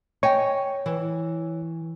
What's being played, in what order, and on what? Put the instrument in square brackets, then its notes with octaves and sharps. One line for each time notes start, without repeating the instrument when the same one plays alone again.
[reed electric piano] C#5 C#6 [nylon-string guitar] D#5 G5 G#5
[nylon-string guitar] E3